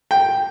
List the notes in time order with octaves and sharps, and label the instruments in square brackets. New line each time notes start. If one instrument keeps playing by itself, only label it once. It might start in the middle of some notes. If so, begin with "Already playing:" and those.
[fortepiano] G5